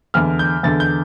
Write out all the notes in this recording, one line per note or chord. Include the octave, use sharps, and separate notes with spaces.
E2 D3 F6
G6
E2 D3 A6
G6